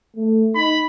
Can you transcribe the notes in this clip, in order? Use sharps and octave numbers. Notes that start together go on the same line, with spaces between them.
A3
D#4 B5